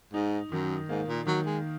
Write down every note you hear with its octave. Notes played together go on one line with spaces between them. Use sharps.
G#2 D#4
F#2 D#3
G#2 A#3
A#2
D#3 F#3
G#3